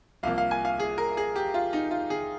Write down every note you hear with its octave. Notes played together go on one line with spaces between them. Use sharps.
C2 C3 F3 A#3 F5
F5
G#5
F5
G#4
A#4
G#4
G4
F4
D#4
F4
G#4